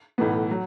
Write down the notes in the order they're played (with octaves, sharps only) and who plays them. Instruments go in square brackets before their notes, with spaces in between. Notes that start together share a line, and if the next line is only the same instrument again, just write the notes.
[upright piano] B1 A2 E3 B3
F#3